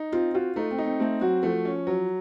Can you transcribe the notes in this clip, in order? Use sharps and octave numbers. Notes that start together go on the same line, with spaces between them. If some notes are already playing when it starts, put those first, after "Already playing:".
Already playing: D#4
C4 F4
F4 F#4
A3 D#4
C4
D#4
C4
A3 C4
F#3 F#4
F3 A3
C#4
F#3